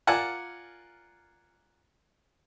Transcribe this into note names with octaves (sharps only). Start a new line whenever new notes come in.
F4 A#4 D5 F#5 G#5 A5